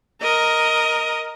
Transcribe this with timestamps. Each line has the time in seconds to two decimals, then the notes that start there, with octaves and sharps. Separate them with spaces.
0.22 A#4 D#5